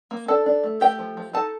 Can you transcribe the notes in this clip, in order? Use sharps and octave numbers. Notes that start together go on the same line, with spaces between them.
A#3
D4 A4 A5
D4
A3
A3 G4 G5
F3
F3
D#4 A4 A5